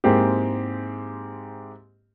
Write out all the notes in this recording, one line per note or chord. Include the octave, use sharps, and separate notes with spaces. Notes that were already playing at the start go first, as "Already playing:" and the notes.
G#2 G#3 A#3 C4 E4 G4